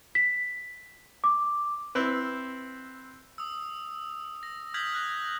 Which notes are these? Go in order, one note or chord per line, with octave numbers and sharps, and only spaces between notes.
B6
D6
C4 E4 B4
D#6 E6
A#6
D#6 F6 G6 G#6 B6 F#7
F6 F#6 A#6